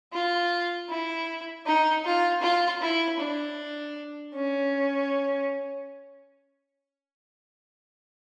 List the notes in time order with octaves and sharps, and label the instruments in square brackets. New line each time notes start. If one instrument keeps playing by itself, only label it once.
[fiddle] F4
E4
D#4
F4
F4
E4
D4
C#4